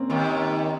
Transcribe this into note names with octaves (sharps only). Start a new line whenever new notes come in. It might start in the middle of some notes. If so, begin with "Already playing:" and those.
Already playing: A#3 C4 C#4
D#2 D#3